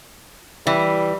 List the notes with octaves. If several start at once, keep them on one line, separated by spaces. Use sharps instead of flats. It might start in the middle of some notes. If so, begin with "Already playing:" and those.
E3 G3